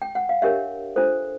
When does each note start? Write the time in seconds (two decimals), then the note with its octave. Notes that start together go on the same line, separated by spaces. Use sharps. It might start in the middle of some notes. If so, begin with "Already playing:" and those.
0.02 G5
0.15 F#5
0.29 F5
0.42 D4 G4 A#4 C#5 E5
0.96 D4 F4 A4 C5